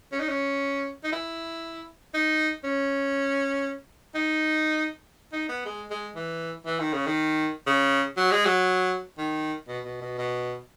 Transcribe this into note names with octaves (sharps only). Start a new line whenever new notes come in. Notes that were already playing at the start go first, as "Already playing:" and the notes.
C#4
D#4
C#4
D#4
E4
D#4
C#4
D#4
D#4
B3
G#3
G#3
E3
E3
D#3
C#3
D#3
C#3
F#3
G#3
F#3
D#3
B2
B2
B2
B2